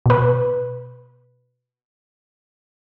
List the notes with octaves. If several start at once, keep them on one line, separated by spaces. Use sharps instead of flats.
B2 B4